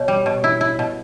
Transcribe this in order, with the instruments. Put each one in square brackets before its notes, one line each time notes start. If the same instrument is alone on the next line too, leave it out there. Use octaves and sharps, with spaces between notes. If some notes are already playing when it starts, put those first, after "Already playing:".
Already playing: [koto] B2 [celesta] C#5
[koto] G3
B2
E4
E4
B2